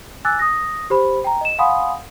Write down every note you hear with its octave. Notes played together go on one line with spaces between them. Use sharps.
G#5 D6 E6 F#6 A6
D#6 A#6
G4 C5 B5
G5 A#5
D#5 E7
F5 F#5 G#5 B5 C6 D#6